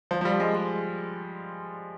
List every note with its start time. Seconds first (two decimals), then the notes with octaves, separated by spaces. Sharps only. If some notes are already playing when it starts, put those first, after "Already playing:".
0.11 F3
0.21 F3
0.25 G3
0.40 G#3
0.55 G#3